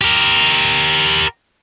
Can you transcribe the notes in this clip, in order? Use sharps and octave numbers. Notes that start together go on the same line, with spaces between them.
G4 A#4